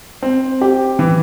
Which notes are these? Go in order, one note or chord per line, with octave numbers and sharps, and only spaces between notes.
C4
G4
E3